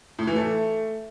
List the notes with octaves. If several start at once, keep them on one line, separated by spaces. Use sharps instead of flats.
A2
E3
A3